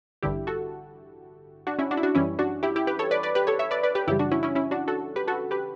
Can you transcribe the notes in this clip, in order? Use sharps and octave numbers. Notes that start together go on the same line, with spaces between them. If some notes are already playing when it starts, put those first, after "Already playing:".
A1 G2 D3 E4 G4
F#4 A4
D4 F#4
C#4 E4
D4 F#4
E4
D4 F#4
F#2 E3 G3 C#4 E4
D4 F#4
E4 G4
E4 G4
G4 B4
A4 C#5
B4 D5
B4 D5
G4 B4
A4 C#5
C#5 E5
B4 D5
B4 D5
G4 B4
F#2 C#3 E3 G3 E4 G4
D4 F#4
C#4 E4
C#4 E4
C#4 E4
D4 F#4
F#4 A4
G4 B4
F#4 A4
G4 B4